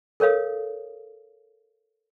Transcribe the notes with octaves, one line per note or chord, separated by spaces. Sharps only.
A4 A#4 C#5 F5 D#6